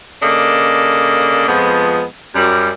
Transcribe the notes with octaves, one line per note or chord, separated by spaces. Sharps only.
C#3 A#3 D4 A4 D#5
F2 F3 G#3 B3
F#2 G3